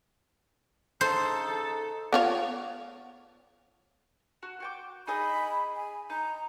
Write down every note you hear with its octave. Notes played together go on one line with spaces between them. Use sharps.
C#3 D#4 A4 C5
B3 F4 C#5
F#4
F#4 G5 D6
D#4 G#4 D#5 B5
G#5
D#4 A#5